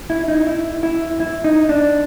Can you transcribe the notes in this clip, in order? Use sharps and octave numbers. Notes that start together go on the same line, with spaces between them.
E4
D#4
E4
E4
E4
D#4
D4